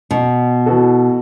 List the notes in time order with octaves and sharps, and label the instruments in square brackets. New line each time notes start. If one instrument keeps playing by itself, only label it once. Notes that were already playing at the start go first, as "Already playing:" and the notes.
[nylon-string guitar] B2
[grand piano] E3 B3 F#4 A4